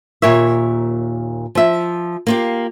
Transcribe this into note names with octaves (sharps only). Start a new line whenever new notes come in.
D#2 A#2 A#4 C#5 E5
F3 E5
A#3 F4 G4